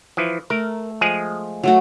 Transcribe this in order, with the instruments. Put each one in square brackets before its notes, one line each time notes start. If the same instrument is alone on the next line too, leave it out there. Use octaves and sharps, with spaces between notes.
[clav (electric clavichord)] E3 F3
[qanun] A3 [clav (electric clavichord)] A#4
[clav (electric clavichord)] F3 G#3 G#4
[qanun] F#3 A3 F#4